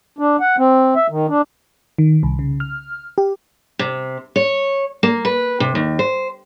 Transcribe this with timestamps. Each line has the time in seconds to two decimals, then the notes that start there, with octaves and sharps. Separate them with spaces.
0.19 D4
0.40 F#5
0.58 C4
0.96 E5
1.10 D#3
1.29 D4
1.98 D#3
2.23 C2
2.39 C#3
2.60 F6
3.18 G4
3.79 C3
4.36 C#5
5.03 A#3
5.25 B4
5.60 C3
5.75 D#2
5.99 C5